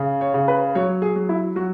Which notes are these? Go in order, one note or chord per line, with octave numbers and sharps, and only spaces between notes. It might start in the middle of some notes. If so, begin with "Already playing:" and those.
Already playing: C#3
C#5
C#3
B4
F#3 C#5
G#4
F#3
E4
F#3 F#4